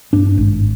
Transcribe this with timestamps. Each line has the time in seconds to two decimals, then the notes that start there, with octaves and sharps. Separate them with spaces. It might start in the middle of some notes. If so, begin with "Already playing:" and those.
0.13 G2 D4
0.37 G#1